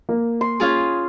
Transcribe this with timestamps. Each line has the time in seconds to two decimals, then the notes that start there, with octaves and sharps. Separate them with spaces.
0.09 A#3
0.41 C6
0.60 C#4 F4 G#4